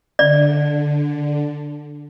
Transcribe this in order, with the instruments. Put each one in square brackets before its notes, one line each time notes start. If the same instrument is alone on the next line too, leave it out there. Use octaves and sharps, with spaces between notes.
[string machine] D3 [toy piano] D5